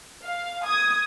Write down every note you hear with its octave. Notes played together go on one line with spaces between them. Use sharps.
F5
D#6 G#6